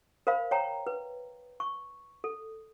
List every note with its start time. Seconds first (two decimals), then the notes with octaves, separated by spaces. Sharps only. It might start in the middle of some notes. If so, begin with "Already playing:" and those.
0.27 A#4 C5 F5 B5
0.51 C#5 G5 A#5
0.87 B4
1.60 C#6
2.24 A4